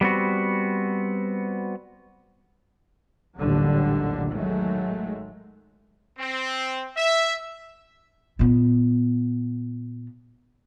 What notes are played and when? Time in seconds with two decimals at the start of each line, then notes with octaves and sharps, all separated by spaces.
0.01 G3 B3 C4 F#4
3.38 A1 D#2 A#2 D3 F#3 G3
4.32 D#3 F#3 G#3 A3
6.18 C4
6.96 E5
8.39 A#2 B3